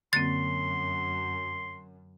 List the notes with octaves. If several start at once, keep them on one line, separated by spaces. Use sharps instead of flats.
F#2 D3 A#3 C4 C6 A6